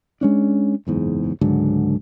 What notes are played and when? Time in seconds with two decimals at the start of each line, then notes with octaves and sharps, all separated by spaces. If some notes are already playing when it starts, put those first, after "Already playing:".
0.21 G#3 C#4 D4
0.87 F#1 E2 G#2
1.41 C#2 G#2 D3 F#3